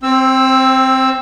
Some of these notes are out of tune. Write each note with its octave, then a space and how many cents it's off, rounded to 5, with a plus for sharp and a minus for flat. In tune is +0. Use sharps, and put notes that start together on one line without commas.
C4 +5 C5 +35 E6 +0